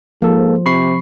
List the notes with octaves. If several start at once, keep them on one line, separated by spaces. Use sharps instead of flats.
G#2 F3 A#3 A4
C3 B5 C#6 C7